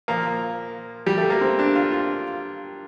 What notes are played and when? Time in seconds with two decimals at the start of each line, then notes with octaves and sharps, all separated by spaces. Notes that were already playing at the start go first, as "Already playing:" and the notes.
0.08 A#2 F3 A#3
1.06 G3
1.18 A3
1.30 A#3
1.41 C4
1.59 D4
1.76 F4
1.91 F4